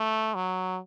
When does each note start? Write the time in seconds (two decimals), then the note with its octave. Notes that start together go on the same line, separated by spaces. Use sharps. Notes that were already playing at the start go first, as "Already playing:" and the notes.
Already playing: A3
0.35 F#3